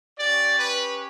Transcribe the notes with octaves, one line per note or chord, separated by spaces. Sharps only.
C#4 G4 D5
B4